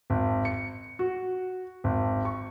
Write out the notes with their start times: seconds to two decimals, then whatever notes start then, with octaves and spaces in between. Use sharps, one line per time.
0.10 G#1
0.45 C#7
0.99 F#4
1.84 G#1
2.25 C#6